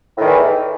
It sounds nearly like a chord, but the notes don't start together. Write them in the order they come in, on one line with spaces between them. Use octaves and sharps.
A2 D#3 E2 E3